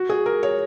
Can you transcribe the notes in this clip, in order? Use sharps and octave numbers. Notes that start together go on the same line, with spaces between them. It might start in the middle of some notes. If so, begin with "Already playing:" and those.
Already playing: F#4
G#4
A#4
C#5